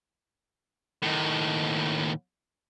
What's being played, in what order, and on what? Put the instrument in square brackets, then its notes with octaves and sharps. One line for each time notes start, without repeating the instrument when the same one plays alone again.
[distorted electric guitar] D#2 A2